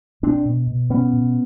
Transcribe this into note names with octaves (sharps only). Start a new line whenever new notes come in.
B2 C4 D4
B2
B2
B2 B3 C#4
B2